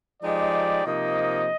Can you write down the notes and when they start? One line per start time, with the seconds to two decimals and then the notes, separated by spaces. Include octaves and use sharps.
0.22 F3 G#3 D#4 G4 D5
0.85 C3 F3 A#3 D#4 D#5